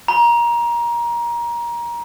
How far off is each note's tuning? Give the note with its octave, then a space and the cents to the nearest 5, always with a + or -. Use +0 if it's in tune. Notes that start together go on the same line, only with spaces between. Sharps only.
A#5 +20